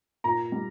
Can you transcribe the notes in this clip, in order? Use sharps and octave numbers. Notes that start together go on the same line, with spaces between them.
A#2 A#5
G3